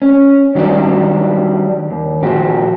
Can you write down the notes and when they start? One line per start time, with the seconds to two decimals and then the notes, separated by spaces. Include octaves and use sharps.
0.02 C#4
0.55 D#3 F#3 G3 D4
1.91 D#2
2.23 A#2 F3 F#4 G4